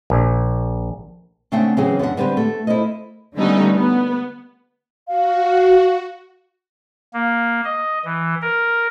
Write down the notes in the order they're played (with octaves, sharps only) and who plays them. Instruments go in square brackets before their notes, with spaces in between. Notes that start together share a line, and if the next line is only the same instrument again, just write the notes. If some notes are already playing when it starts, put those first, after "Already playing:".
[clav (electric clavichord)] A#1
[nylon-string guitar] C#3 A3 C4 D4 F#5 G5
C#3 E3 F#3 C4 C#4 G#4
F#2 B3 D4 F#5
D3 G3 B3 C4 G4 B4
A3
E4 A4 A#4 C5 D#5
[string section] D3 G3 A3 B3 C#4 D#4
B3
[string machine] F#4 [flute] F5
[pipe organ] A#3
D#5
E3
A#4